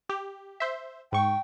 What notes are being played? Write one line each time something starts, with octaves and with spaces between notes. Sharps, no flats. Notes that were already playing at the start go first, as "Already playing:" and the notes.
G4
C5 E5
G#2 G5 C#6